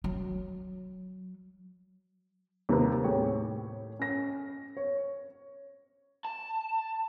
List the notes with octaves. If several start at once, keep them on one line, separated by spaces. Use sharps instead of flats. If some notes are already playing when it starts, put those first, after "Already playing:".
F#3
D#2 C3 G4 B4
A2 G4 G#4 C#5
C#4 A#6
C#5
A5